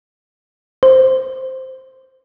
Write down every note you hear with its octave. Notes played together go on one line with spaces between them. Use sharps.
C5